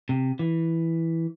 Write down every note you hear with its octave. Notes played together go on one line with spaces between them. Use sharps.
C3
E3